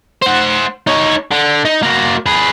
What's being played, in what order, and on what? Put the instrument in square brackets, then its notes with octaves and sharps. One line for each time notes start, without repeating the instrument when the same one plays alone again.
[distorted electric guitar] C5 F#5
D#4 C#5
D3
D#4
A#3 F#4
G#4 B4